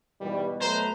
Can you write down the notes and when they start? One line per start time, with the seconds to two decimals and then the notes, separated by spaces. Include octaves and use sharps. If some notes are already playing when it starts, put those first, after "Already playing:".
0.21 G#2 B2 E3 G3
0.61 F#3 A3 B4 C5 A#5